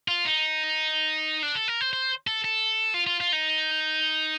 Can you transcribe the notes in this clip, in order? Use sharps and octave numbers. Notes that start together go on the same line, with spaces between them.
F4
D#4
D4
A4
A#4
C5
C5
A4
A4
F4
F4
F4
D#4